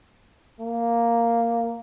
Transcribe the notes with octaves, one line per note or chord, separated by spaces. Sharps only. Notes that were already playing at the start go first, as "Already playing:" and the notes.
A#3